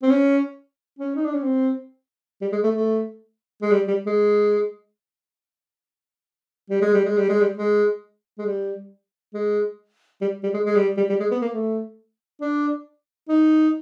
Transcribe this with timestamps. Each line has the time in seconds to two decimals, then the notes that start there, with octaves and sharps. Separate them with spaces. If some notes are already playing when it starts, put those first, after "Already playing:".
0.03 C4
0.11 C#4
0.99 C#4
1.16 D#4
1.25 D4
1.34 C#4
1.43 C4
2.42 G3
2.52 G#3
2.64 A3
2.75 A3
3.62 G#3
3.71 G3
3.88 G3
4.07 G#3
6.70 G3
6.82 G#3
6.94 G3
7.05 G#3
7.17 G3
7.29 G#3
7.41 G3
7.57 G#3
8.39 G#3
8.46 G3
9.34 G#3
10.22 G3
10.43 G3
10.54 G#3
10.65 G#3
10.76 G3
10.97 G3
11.09 G3
11.20 G#3
11.31 B3
11.42 A#3
11.54 A3
12.41 D4
13.29 D#4